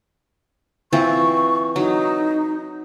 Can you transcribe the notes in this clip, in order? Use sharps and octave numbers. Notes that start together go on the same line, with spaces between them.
E3 C4 F4 C#6
F#3 D#4